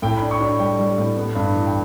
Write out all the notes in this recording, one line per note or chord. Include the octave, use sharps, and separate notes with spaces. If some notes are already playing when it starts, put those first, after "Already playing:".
A2 G5
D4 B5
C#6
D4
B5
G3 G5
G3
A2
B3
G2
E3
G5